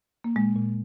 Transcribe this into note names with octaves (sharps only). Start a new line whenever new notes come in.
A#3
A#2 G#3
A#2